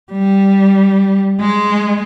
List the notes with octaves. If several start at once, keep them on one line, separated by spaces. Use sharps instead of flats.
G3
G#3